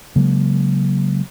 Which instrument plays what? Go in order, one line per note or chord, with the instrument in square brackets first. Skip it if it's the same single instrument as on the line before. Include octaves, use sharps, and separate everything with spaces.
[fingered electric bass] C#3 F#3 G#3 A#3